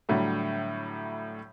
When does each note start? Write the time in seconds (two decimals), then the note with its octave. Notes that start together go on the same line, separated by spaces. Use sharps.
0.09 A2 D3 F#3 G3 A3